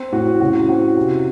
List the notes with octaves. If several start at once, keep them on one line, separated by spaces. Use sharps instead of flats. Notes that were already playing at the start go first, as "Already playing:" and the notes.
Already playing: C4
A2 F#4
C#3 F#4
C4 F#4
C3